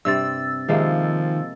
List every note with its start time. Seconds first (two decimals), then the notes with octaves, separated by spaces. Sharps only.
0.05 G2 C3 C4 E6 A6
0.68 C3 D#3 F3 G#3 A#3